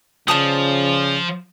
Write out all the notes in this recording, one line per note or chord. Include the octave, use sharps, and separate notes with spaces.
C#3 F3 D5 A5 D#6